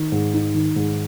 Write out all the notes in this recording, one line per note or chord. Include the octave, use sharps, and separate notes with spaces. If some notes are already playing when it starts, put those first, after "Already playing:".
Already playing: D#3
G#2
D#4
D#3
G#2